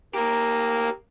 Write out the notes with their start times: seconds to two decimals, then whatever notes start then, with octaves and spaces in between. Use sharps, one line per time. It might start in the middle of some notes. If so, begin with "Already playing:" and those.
0.14 A#3 G4 A#4